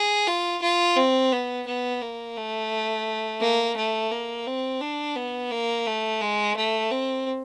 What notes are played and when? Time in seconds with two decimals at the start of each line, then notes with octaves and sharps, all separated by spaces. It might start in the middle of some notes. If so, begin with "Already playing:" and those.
Already playing: G#4
0.27 F4
0.62 F4
0.97 C4
1.32 B3
1.67 B3
2.02 A#3
2.37 A3
3.41 A#3
3.76 A3
4.11 A#3
4.46 C4
4.81 D4
5.16 B3
5.51 A#3
5.86 A3
6.21 G#3
6.56 A3
6.91 C4